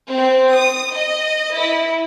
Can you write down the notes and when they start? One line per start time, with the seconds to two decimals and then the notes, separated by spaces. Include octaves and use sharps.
0.11 C4
0.56 D#6
0.94 D#5
1.54 E4